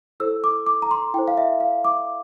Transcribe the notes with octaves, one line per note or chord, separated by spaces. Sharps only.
E4 A4 C5 E6
D6
D6
A#5
C6
E4 A4 C5 G5
F5
E5
F5
D6